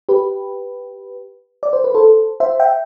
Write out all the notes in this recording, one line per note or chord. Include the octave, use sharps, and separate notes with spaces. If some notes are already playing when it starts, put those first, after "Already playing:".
G4 B4
D5
C5
B4
A4 C5
C5 E5
E5 G5